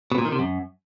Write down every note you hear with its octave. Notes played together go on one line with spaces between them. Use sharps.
B2
A#2
D#3
C3
F#2